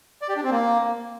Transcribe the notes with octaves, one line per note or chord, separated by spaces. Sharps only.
D5
G4
D4
C4
A#3